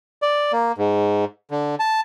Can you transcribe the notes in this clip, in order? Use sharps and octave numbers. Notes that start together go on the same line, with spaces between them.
D5
A#3
G#2
D3
A5